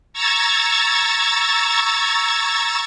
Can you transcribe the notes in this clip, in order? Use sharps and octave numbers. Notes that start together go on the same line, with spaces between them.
A#5 C#6 E6 G#6 A6